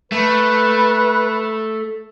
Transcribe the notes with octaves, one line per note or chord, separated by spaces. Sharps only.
A3 B4